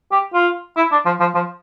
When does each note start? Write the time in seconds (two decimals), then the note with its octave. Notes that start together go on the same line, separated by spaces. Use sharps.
0.12 G4
0.34 F4
0.76 E4
0.91 D4
1.06 F3
1.20 F3
1.34 F3